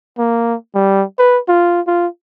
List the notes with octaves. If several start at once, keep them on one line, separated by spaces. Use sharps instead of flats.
A#3
G3
B4
F4
F4